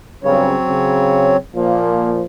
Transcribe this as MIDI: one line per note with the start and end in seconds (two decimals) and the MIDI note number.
0.24 0.55 43
0.24 0.55 49
0.24 1.37 54
0.24 1.37 60
0.24 1.37 73
0.69 1.38 49
1.55 2.24 46
1.55 2.24 53
1.55 2.10 58